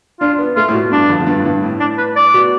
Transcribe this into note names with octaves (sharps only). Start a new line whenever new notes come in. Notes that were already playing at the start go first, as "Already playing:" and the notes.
D4 F4
B3
A3 F4
A2
B2
G2 D4
F2
F2
G2
A2
G2
A2
D4
B4
D5
B2